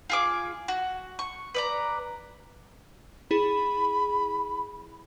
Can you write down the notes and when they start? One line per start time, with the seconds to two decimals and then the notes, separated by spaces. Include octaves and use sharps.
0.10 F4 G#4 D6
0.68 F#4
1.19 C#6
1.55 B4 D5 A#5
3.31 E4 G#4 B5